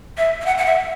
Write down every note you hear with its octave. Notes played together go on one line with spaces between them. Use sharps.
E5
E5
F#5
F#5
E5